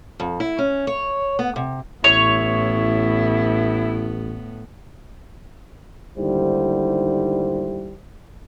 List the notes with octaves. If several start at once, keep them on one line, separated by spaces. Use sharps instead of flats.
F2
E4
C#4
C#5
B3
C3
A1 A2 B3 E4 C#5
D#2 G#2 D3 G3 E4 C5